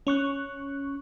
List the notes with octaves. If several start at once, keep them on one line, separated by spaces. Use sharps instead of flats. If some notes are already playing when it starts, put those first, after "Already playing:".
C#4 C#6 F#6